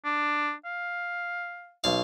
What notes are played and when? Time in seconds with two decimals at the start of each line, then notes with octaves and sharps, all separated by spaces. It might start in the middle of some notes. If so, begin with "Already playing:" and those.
0.05 D4
0.65 F5
1.84 B1 F5